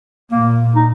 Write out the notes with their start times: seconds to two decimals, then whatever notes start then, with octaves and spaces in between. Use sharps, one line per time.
0.32 A#2 A#3
0.75 D#4